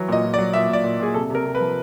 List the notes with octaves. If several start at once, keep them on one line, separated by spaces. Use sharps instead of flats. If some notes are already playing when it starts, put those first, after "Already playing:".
Already playing: E3 F#3
A#2 D#5
A#2
D5
F#3
A#2 E5
A#2
D5
A#2
A#2 G#4
C3 A4
C3 A#4
C3
B4
F3